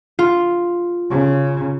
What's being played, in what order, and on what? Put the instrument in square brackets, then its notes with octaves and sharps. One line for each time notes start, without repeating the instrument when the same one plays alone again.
[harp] F4
[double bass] C#3